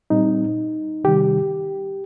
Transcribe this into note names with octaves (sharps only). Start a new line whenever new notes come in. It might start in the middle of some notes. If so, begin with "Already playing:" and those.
A#2 G3 C4 D#4
C3 D#3 G3 G4